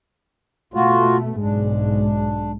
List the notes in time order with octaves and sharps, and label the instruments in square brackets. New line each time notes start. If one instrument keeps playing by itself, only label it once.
[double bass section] B2 A3 [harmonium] F4 F#4
[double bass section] B1 G#2 G#3 [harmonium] D4